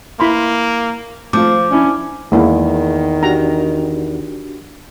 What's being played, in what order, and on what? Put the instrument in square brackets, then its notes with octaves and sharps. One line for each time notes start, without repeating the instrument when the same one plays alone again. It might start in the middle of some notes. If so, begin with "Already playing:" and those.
[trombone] A#3 [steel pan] E4 B5 C6
[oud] F3 [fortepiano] A3 F4 [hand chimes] D6
[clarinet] C#4 [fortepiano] D4 E4
[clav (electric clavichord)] E2 [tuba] D#3 [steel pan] G#3 A#3 E4
[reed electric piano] D4 F#4 G4 [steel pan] A#5